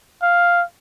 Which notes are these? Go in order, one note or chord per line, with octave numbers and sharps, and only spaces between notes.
F5